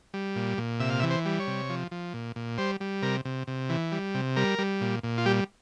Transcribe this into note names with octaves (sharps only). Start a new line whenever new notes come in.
G3
A#2
A#2
C3 E5
F5
E5
E3
C5
G3
C#5
C3
F3
F3
A#2
A#2
G3 C5
G3
C3 A#4
C3
C3
E3
G3
C3
G3 A#4
G3
A#2
A#2
F4
G3 G4